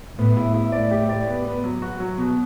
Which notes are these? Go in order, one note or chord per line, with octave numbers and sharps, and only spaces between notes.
A2 B3
E4
E4
A2 D5
G4
D5
B3
B3
F#3
F#4
F#3
B2